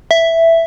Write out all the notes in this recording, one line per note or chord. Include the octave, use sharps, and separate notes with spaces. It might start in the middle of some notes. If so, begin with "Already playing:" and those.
E5